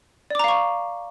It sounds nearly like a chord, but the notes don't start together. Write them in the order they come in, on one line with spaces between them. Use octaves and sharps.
D5 D6 A#5 F5 C#6